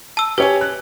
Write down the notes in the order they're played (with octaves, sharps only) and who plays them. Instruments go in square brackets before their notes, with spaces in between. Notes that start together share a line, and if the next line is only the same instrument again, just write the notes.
[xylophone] A5 E6
[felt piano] G4 C#5 G#5 [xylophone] B4
[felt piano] F#6